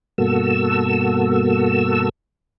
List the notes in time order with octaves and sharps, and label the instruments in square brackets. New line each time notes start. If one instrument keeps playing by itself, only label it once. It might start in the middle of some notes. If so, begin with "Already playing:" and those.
[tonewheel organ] G2 B2 A#3 F#4 A4 E6